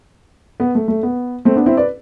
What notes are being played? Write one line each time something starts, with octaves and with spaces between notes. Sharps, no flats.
B3
A3
A3
B3
A3 C4
B3 D4
C4 E4
B4 D5